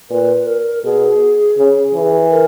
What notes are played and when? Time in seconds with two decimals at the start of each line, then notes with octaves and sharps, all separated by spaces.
0.10 A#2 B4
0.46 A#4
0.84 B2 G#4
1.58 C#3
1.95 E3
2.31 A#4